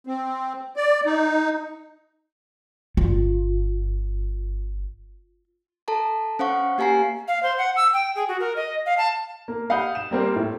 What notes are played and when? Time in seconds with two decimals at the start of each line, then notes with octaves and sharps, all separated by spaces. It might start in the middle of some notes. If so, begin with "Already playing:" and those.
0.07 C4
0.76 D5
1.05 D#4
2.97 G1 F4
5.88 A4 A5 A#5
6.39 C#4 C5 F5 F#5 C#6
6.78 A#3 G4 F5 G#5 A#5 C7
7.28 F5
7.43 C5
7.58 F#5
7.76 E6
7.93 G5
8.16 G#4
8.28 F#4
8.40 A#4
8.56 D#5
8.86 F5
8.98 A5
9.48 A#3
9.70 F5 F#5 B5 D#6 G6
9.95 E7
10.11 G3 A#3 C4 G4
10.36 A2